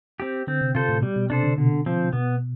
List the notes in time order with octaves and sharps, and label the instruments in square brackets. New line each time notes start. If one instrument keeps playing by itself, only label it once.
[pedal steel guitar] C4 G4
[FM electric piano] D3 [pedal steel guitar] C4
[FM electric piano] C3
[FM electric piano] C3 [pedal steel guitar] F4 A4 C5
[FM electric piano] A2
[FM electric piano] B2 [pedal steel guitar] G3
[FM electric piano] B2
[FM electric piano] C3 [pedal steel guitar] D4 A4 C5
[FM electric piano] D3
[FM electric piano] B2 [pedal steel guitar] D3
[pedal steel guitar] F3 C4
[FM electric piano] B2 [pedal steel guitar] B3